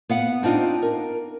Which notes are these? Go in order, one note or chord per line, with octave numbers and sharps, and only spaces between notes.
B3 F5 F#5
C4 D4 D#4 F4
A#4